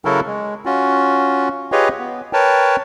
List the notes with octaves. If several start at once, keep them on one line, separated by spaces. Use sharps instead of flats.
C#3 F#3 E4 F#4 A4 A#4
G#3
C#4 F4 F#4
F4 G4 G#4 B4 C#5 D#5
B3
A#4 B4 C#5 G5 A5